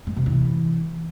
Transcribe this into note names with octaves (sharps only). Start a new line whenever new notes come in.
G#3
C3
E3